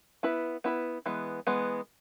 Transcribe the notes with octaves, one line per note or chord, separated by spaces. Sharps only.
B3 E4 B4
B3 E4 B4
E3 G#3 B3
E3 G#3 B3